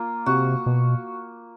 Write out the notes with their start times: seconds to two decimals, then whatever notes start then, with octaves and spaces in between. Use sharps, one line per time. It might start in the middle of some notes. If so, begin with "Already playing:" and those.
Already playing: A#3 F4
0.26 C3 F#4
0.66 B2